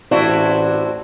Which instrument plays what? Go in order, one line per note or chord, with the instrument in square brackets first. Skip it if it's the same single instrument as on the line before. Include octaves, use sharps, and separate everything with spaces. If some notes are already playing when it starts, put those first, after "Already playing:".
[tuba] A1 [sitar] C4 E4 F#4 [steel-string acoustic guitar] D4